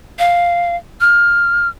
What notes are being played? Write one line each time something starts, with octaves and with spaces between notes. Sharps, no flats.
F5
F6